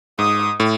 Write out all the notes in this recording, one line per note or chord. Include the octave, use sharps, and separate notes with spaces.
G#2 D#6
A2